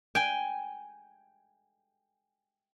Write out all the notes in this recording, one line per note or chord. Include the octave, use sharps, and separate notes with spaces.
G5 G#5